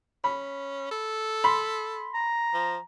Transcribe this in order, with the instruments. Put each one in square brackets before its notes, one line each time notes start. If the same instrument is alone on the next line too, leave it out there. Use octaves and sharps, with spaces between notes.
[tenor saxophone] C#4 [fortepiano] B5
[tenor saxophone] A4
[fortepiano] B5 C6
[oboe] A#5
[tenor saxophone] F3